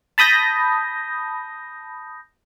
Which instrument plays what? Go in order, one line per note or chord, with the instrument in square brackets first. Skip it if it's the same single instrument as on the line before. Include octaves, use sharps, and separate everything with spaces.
[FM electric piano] A5 B5 D#6 G6 A#6